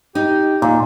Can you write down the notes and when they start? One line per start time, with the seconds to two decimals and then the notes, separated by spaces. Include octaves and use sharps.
0.15 D#4 G4
0.62 D#2 A#2